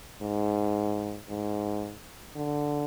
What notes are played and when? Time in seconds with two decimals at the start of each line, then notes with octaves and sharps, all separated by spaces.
0.21 G#2
1.29 G#2
2.36 D3